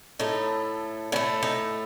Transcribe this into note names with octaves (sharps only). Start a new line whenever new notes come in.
A2 A3 D#4
A2 A3 C#4
D#4